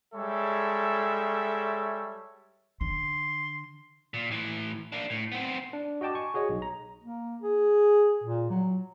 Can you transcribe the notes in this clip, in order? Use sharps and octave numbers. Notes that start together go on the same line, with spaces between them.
G3 G#3 A4 C#5 E5
D3 C6
A#2
A2 E3
A#3 D4
A2
B3 C4
D4
F#4 D#5 G5 A5 D6
G#5 C#6
F#4 G#4 C#5 D#5
B1
A#5
A#3
G#4
A#2
F#3